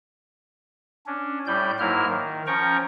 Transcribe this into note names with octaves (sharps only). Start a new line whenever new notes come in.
C#4 D4
A2 G3 D5 G6
G#2 F#3 A#3 E4 F6
D#3
F3 C#4 G5 A#5 C#6